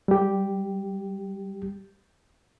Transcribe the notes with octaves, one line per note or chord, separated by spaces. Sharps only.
G3 G4